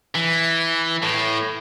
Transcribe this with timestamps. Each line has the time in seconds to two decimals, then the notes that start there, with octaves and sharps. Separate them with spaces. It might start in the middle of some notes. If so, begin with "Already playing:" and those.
0.15 E3
1.03 A2